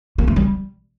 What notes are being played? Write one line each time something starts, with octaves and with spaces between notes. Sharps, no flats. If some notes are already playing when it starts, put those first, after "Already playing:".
A#3
A3
G3